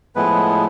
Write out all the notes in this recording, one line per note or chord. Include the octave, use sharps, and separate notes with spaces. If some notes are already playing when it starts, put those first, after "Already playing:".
A2 F3 G#3 B3 E4 B4